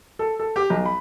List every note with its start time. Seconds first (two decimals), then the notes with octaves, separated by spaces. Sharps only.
0.19 A4
0.39 A4
0.56 G4
0.70 B1
0.86 B5